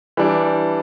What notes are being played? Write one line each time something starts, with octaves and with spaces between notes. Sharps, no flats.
E3 G3 D4